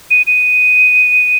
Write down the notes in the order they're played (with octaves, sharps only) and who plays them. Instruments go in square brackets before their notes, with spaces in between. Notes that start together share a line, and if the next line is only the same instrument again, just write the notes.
[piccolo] D#7
D#7